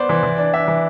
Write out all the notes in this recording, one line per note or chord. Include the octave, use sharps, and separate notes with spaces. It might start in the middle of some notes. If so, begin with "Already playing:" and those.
Already playing: B3 C5 D5
E3
E3
D4
D4 E5
E3